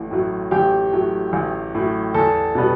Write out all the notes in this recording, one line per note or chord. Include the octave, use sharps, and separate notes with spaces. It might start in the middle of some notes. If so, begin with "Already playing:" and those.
Already playing: A1 A2
A2 F#3
A1 G4
A2 F#3
A1
A2 F#3
E2 A4
B2 G3 B3